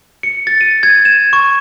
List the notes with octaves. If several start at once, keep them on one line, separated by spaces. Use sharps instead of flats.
C#7
A6
D#7
G#6
E7
C#6